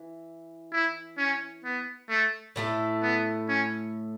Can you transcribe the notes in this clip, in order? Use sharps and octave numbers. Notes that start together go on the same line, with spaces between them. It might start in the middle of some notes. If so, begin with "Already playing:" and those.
Already playing: E3
E4
C#4
B3
A3
A2 A3 E4 A4
B3
C#4